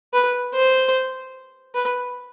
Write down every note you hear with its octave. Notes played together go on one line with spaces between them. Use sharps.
B4
C5
B4